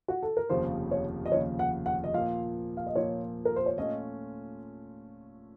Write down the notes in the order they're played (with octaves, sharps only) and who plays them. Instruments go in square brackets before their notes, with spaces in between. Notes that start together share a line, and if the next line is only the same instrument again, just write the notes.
[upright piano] F#4
A4
A#4
[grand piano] F1 D#2 C#3 F3 [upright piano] C5
[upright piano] C#5
D#5
[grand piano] F1 D#2 C#3 F3 [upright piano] C#5
[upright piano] F#5
F#5
D#5
[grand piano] A#2 F3 A#3 [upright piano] F5
[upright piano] F5
D#5
[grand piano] A#2 F3 A#3 [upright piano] C#5
[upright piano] A#4
C5
C#5
[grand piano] A#2 A3 C#4 F4 [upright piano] D#5